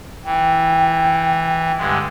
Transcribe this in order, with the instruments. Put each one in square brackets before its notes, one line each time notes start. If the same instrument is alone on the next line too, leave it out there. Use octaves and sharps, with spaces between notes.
[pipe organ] E3 [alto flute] G5
[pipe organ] G2 D3 G#3